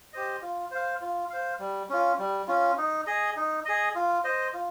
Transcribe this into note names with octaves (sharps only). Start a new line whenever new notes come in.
G4 C5 D#5
F4
C5 F5
F4
C5 F5
G3
C#4 F4
G3
C#4 F4
D#4
G#4 D#5
D#4
G#4 D#5
F4
C5 D#5
F4